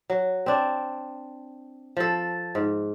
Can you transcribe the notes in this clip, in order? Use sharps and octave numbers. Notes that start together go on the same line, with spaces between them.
F#3
C4 D4
F3 A4
G#2